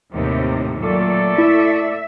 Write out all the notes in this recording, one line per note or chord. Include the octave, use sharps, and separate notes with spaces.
D#2 A2 C3
A#2 F#3 A3 A4 D5
E4 E5